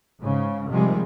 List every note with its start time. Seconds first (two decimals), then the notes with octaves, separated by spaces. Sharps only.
0.19 G#2 C#3
0.68 C3 D#3 F3 G3 G#3